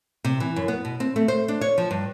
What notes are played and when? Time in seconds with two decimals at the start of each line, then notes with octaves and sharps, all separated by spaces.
0.24 C3
0.40 E3
0.56 F#2
0.68 B3
0.85 B2
1.00 C4
1.16 A3
1.28 C5
1.48 D4
1.61 C#5
1.78 F3
1.91 G2